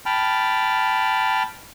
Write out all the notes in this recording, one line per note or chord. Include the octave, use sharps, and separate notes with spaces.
G5 A5 B5 F6